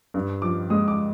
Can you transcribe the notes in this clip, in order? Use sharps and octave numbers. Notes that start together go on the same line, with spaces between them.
G2
F3 D6
G#3 D#6
D6